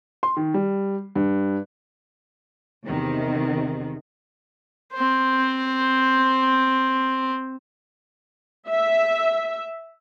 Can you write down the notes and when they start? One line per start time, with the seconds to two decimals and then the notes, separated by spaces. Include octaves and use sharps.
0.23 C6
0.37 D#3
0.54 G3
1.15 G2
2.86 E2 C3 D#3
4.93 C4 C5
8.69 E5